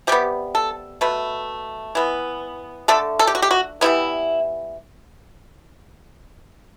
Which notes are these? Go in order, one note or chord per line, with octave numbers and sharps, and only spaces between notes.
C3 G3 B3 G4
A4
B2 A3 B4
E3 B3
D3 A3 A4
A4
G4
F#4
G4
F#4
E3 G3 B3 E4